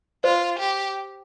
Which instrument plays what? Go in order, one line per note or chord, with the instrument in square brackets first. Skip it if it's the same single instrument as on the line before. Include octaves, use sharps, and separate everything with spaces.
[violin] F4 [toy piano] C5
[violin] G4